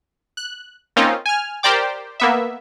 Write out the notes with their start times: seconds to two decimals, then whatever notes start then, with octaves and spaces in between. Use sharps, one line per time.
0.37 F#6
0.96 A#3 C4 C#4 D#4 F4
1.26 G#5 F6
1.63 G4 A#4 C5 D5 G5 D6
2.20 A#3 B3 E5